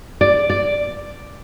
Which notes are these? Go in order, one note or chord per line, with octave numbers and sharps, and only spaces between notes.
D5
D5